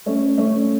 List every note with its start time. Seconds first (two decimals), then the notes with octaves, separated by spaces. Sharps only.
0.06 A3 C#4
0.37 A3 C#4